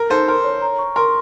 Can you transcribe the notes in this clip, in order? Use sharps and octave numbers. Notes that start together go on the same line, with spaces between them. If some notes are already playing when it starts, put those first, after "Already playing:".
Already playing: A#4
D#4 A4 C5
A#4 C6
C#5
A#5
C#6
A#4 C6